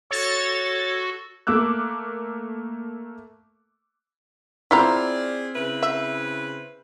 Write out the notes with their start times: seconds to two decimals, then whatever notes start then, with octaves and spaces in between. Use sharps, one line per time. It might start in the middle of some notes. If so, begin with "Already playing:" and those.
0.11 F#4 A4 C#5 A6
1.47 A3 A#3 D6 E6 F#6
4.71 C4 E4 F4 G#4 D5 A#5 F6 B6
5.55 C#3 E4 B4
5.83 E5